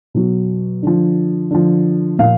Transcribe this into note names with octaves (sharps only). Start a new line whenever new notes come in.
B2 F#3
D3 F3
D3 F3
A#2 F3 F5